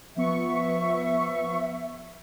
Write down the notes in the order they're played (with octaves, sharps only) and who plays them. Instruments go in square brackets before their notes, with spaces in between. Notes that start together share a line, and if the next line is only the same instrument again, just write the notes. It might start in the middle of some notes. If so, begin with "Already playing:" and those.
[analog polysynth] F3 B3 C#6 [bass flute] E5